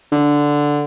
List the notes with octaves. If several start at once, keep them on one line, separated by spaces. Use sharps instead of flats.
D3